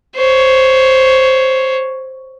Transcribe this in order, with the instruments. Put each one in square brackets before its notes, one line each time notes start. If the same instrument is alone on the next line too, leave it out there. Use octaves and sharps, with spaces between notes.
[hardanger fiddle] C5 C#5